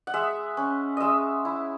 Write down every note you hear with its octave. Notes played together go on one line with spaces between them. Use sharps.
F#5
G#3 E5
C#4
G#3 D#5 E5
E4